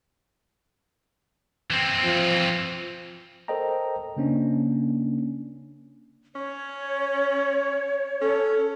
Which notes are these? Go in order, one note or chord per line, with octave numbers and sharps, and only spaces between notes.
E3 C4
F3
A4 A#4 C5 D#5 G5 A#5
C#3 A#3 C#4 D4
C#4 C#5
C#4 A4